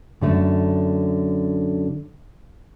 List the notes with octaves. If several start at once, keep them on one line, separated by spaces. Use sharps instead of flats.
F#2 D3 A3